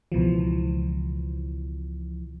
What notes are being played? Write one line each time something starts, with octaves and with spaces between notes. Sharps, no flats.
C#2 B2 E3 F3